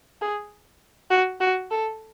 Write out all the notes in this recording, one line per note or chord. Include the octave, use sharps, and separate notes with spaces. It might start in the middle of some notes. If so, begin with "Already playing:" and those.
G#4
F#4
F#4
A4